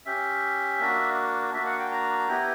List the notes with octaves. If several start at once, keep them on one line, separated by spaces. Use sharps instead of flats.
C#4 G4 E5
A#3 D4 F#4
A#3 D4 F#4 E5
F#5
G5
A#5
B3 E4 G4